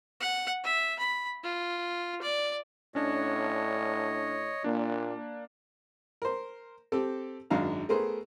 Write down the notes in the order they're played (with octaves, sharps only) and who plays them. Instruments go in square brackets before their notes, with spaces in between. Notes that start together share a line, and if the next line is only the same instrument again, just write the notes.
[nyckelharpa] F#5
E5
B5
F4
D5
[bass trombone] A2 [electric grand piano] C#4 D4 [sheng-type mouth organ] C#5 D#5
[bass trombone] A#2 [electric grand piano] A#3 D4
[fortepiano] A#4 C5
C4 G4 A4
G#1 F#2 D4 F5 A#5
A3 B3 G#4 A#4 C5